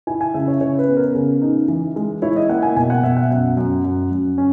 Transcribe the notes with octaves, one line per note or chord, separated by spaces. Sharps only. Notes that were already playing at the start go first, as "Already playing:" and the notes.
E4 G#5
G#5
C#3 E5
C#5
C#3 C#5
B4
B3
A#4
C#3
D#4
E3
G#3
E4 C#5
D#5
A#3 F#5
G#5
B2 G#5
F#5
B2 E5
F#5
F#2 F#5
F#2
F#2
F#2
C#4